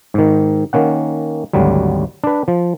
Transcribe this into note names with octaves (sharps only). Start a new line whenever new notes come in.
G#2 D#3
D#3 A#3 C#4 F#5
G#1 D2 F#3 G3
D4 B4
F3